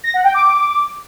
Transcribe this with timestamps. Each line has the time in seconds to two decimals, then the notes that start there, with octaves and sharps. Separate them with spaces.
0.04 A#6
0.14 F#5
0.24 G5
0.34 D6